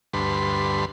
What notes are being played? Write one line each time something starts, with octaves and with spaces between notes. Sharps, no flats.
D2 G2 B4 C6